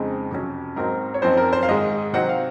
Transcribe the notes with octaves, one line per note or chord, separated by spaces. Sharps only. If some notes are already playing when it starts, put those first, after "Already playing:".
Already playing: F2 C#3 G#3 C4 D#4
F2 C3 F#3 C#4
G#2 F#3 C4 D#4 A#4
C#5
F#2 F3 C4 D#4 C5
A#4
C5
F5
G#2 D#3 G#3 D#5
C3 F#3 C4 D#4 F#5
F5